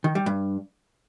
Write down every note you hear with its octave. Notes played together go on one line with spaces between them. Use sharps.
D#3
G3
G2